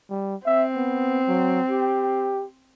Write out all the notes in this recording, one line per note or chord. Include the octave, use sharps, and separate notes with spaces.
G3
C4 E5
B3
F#3
G4